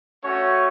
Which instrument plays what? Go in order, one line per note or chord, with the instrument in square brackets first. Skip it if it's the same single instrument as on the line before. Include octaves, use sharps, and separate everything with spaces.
[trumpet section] A3 C#4 F#4 C#5